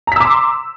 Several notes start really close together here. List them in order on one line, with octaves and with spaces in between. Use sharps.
A#5 B6 E6 D6 C6